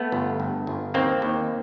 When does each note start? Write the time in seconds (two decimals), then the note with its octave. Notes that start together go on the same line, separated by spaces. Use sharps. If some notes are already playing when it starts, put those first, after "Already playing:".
Already playing: A3 B3
0.12 G1
0.40 G2
0.67 G1
0.94 D#2 A#3 C4
1.22 D#2